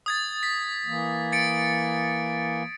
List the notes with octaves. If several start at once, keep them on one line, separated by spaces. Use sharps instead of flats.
D#6 G#6 A6
B6
E3 A#3
A6 C#7 D7